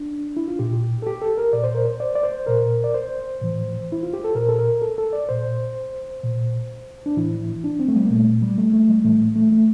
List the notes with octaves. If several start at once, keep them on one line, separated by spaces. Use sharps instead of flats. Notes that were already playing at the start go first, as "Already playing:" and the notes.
Already playing: D4
E4
F4
A#2 G4
A4
G4
A4
A#4
A#2 D5
C5
A#4
C5
D5
D5
C5
A#2 A#4
D5
C5
A2 E3
E4
F4
G4
A4
A#2 A#4
A4
A#4
A4
A4
D5
A#2 C5
A#2
D4
A2 E3 E4
D4
C4
A3
G3
A#3
A#2 A3
G3
A3
A3
G3
A2 E3 A3
A3
A3